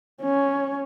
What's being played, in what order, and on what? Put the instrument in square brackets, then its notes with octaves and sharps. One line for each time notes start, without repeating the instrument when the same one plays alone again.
[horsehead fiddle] C#4